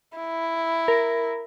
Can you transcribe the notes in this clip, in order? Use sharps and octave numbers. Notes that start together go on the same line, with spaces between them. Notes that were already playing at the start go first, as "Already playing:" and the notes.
E4
A#4